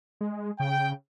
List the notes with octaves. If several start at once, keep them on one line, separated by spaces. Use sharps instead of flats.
G#3
C#3 G5